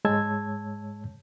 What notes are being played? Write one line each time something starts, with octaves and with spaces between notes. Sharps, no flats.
G#2 G#3 C#5 A5 E6 G#6